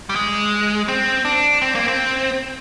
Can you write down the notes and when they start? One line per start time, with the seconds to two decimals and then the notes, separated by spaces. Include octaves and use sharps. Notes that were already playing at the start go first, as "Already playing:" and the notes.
0.09 G3
0.16 G#3
0.88 C4
1.25 D4
1.62 C4
1.75 A#3
1.88 C4